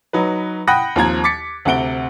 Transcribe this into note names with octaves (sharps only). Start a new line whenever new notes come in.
F#3 D#4 B4
F#5 G5 B5 D#6 F#6 A#6
D#2 F3 C4 A#5 G#6
D6 A6 B6 C#7
D2 C3 C4 F#5 D7 G7